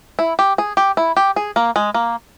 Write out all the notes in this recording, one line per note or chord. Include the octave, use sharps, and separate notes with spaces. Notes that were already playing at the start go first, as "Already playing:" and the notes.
E4
G4
G#4
G4
E4
G4
G#4
A#3
G#3
A#3